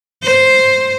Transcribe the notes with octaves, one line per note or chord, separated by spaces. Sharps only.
C5